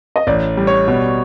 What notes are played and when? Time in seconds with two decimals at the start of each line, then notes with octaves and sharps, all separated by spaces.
0.16 D#5
0.27 A1 D5
0.57 G3
0.67 C#5
0.88 B2